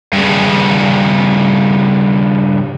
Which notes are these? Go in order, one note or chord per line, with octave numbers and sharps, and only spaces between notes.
G2 C#3